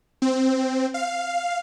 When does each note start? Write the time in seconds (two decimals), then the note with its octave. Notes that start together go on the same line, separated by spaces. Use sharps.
0.22 C4
0.94 F5